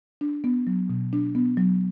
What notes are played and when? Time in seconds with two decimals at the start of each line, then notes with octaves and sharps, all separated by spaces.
0.21 D4
0.44 B3
0.67 F#3
0.89 B2
1.13 D4
1.35 B3
1.57 F#3